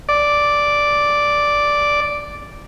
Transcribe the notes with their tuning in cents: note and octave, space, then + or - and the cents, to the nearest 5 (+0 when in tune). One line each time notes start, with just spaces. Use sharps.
D5 -5